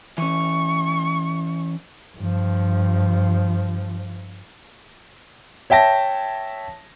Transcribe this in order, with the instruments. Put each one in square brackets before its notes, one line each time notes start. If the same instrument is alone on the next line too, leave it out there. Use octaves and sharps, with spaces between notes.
[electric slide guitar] E3 C#4 [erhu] C#6
[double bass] G2 F3
[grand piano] C#5 E5 G5 A5 A#6